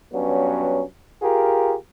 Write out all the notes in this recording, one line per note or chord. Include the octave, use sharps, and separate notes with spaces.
G2 F#3 B3 C#4
F4 G4 G#4 A#4